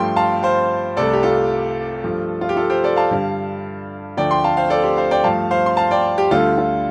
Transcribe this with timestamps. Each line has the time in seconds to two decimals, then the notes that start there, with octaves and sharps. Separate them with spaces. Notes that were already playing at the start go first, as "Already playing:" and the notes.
Already playing: G2 F3 A3 G5 C6
0.16 F5 A5
0.43 C5 F5
0.97 C2 C3 A3 A4 D5
1.13 G4
1.23 F4 A4
2.04 G2 F3 A3
2.41 F4
2.49 G4
2.56 F4 A4
2.70 G4 C5
2.84 A4 D5
2.96 F5 A5
3.11 G2 D3 G3
4.17 D2 D3 F3 A3 D5 G5
4.31 G5 C6
4.44 F5 A5
4.57 C5 F5
4.70 A4 D5
4.83 G4 C5
4.97 C5 F5
5.11 D5 G5
5.24 G2 F3 A3 F5 A5
5.51 C5 F5
5.66 C6
5.77 F5 A5
5.91 D5 G5
6.18 G4
6.31 D2 D3 G3 F4 A4
6.58 F4